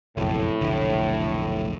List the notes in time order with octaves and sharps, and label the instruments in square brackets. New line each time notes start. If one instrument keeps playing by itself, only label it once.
[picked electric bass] F#1 B1 F2 [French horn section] A2
[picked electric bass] F1 B1 D3